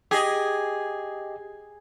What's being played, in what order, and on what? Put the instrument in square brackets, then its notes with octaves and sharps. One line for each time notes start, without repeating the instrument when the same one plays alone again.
[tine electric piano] G4 D#5 [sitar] G#4